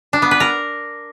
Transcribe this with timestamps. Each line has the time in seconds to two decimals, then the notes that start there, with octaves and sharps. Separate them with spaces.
0.13 D4
0.22 B3
0.31 B4
0.40 A#4